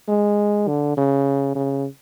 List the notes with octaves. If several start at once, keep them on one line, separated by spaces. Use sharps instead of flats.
G#3
D3
C#3
C#3